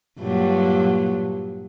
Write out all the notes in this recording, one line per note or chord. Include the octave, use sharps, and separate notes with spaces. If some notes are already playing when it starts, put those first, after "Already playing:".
G2 A#2 F#3